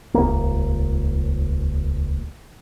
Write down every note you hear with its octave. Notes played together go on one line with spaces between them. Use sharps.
D#1 C#2 A#3